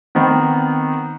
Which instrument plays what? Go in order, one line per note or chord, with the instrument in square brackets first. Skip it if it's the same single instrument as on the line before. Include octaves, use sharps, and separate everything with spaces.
[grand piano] D#3 B3 C4